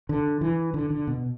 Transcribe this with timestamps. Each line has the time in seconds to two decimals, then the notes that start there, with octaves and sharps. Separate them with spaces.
0.09 D3
0.41 E3
0.74 D3
0.90 D3
1.07 B2